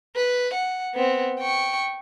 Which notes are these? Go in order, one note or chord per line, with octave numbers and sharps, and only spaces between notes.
B4
F#5
B3 C4
G5 C#6